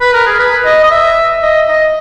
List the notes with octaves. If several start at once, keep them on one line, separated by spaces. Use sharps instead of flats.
B4
A#4
G#4
B4
D#5
D#5
E5
D#5
D#5